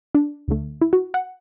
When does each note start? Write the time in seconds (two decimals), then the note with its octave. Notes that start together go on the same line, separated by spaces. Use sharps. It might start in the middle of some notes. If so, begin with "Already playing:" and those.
0.15 D4
0.48 D2 D3 A3
0.81 E4
0.93 F#4
1.14 F#5